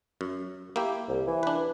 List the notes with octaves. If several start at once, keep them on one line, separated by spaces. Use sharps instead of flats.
F#2
A#3 E4 G4
C2
E3
D4 B4